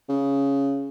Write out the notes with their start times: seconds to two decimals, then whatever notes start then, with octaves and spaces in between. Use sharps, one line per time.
0.09 C#3